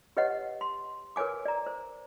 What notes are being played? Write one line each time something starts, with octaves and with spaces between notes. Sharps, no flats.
G4 B4 C#5 D#5 F#5
C6
A#4 B4 C#5 G#5 D6
D5 A#5
C5